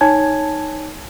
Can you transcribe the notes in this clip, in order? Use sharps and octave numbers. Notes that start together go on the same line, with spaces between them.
D#4 C#5 G#5 A5 G#6